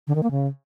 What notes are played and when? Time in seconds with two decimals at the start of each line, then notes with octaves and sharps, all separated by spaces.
0.07 D3
0.15 D#3
0.23 A#3
0.31 C#3